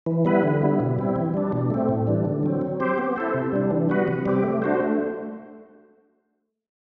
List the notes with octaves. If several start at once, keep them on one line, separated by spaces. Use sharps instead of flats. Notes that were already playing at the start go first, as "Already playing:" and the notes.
E3
G3 B3 E4 B4
D3
G3 B3 E4
B2
G3 C4 E4
E3
G3 D4
B2
A3 C4
A2
E3 G3 D4
D3
F#3 C4
F#3
C4 G4 C5
B3
E4 A4 C5
C3
G3 D4
E3
G3 B3 F#4 B4
C3
G3 C4 G4
A3
D4 F#4 C5
A3